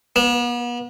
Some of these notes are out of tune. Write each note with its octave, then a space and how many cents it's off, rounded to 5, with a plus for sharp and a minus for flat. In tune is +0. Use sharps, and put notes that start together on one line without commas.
B3 -40